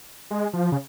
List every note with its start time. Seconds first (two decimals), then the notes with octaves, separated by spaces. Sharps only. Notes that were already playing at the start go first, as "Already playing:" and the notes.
0.31 G#3
0.53 F3
0.72 C#3